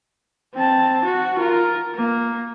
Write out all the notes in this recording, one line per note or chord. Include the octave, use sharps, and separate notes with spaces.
C4 A5
F#4
F4 A#4
A#3